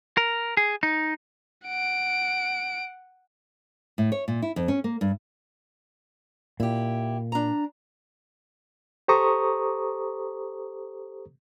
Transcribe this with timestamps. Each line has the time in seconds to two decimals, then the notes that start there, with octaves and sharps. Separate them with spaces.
0.17 A#4
0.57 G#4
0.83 D#4
1.66 F#5 D7
3.98 A2
4.12 C#5
4.28 A#2
4.42 E4
4.56 F2
4.68 C#4
4.84 A#3
5.01 G2
6.60 A#2 E4 G4
7.32 D4 A#5
9.08 G4 A4 C5 A#5 C#6 D#6